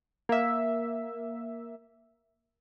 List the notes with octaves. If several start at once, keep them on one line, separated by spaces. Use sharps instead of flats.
A#3 E5